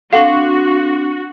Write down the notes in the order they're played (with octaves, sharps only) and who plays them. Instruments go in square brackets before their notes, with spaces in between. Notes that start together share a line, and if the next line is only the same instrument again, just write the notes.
[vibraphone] C4 D4 C#6 [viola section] F#4 [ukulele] A4 F#5 [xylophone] F5